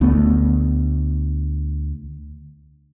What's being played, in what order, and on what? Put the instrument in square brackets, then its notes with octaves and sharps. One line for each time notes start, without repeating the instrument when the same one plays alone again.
[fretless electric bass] D2 A3 B3